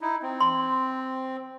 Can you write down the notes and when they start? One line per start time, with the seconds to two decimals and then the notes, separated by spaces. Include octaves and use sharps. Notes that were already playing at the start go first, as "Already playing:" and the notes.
0.01 D#4 E4
0.22 C4
0.40 C6